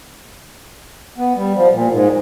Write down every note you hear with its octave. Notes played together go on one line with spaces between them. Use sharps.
B3
G3
F3
A#2
G#2